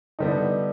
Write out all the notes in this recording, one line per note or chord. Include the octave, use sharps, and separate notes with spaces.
D3 G3 B3 D#4